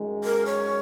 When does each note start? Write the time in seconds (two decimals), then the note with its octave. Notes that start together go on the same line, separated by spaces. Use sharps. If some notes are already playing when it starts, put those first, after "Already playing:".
Already playing: F#2 D#3 G#3
0.24 A#4
0.46 C#5